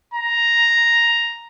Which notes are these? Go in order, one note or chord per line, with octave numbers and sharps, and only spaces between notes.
A#5